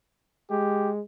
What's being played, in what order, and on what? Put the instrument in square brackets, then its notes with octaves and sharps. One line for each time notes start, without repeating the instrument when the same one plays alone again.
[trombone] G#3 [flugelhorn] G4